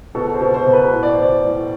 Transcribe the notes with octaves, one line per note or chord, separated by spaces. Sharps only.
B2 A4
C5
B2
C5
B2
B4
A2
D5
C5
E3 D5
A2